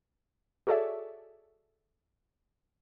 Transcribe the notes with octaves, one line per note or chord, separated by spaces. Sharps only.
F#4 G#4 A4 C#5 D5 E5